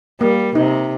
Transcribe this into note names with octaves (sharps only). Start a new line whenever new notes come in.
G3 A#3
C3 D#4